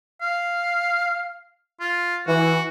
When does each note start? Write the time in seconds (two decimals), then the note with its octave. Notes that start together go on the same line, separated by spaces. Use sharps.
0.21 F5
1.80 F4
2.27 E3 F#4